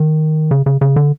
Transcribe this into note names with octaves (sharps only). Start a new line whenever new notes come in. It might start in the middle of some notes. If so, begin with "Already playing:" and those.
Already playing: D#3
C#3
C#3
C#3
D3